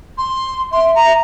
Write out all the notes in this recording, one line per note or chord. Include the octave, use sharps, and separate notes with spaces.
C6
E5 C6
A#5